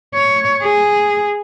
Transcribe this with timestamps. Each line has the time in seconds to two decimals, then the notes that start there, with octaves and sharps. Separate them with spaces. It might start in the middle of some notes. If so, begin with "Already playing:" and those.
0.14 C#5
0.63 G#4